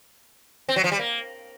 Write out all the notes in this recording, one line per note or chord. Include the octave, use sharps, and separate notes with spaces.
C4
F#3
F3
G3
A#3